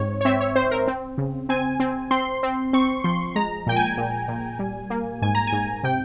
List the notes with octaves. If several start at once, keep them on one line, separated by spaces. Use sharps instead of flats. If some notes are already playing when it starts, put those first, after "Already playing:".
Already playing: G#2 C4 C#5
C#5
C4 E5
C#5
C4 C5
A#4
C4
C#3
C4 G#5
C4
C4 C6
C4
C4 C#6
F3 C6
G#3 A#5
A#2 G5
G#5
A#2
A#2
G3
A#3
G#2 G#5
A#5
G#5
G#2
C3 G5